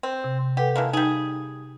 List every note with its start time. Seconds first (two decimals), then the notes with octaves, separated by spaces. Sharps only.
0.03 C4
0.24 C3
0.57 G4 A4 B4 F#5
0.76 E3 G#3 A#3 F5 A5
0.93 G3 D#4 G#4